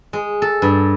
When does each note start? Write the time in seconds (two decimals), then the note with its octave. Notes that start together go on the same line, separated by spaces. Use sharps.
0.13 G#3
0.42 A4
0.62 G2